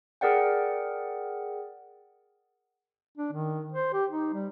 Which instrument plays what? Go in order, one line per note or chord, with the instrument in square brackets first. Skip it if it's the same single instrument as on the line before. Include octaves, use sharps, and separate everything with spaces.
[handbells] G#4 A#4 D5 F#5 G5
[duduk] D4
D#3
C5
G4
D#4
G3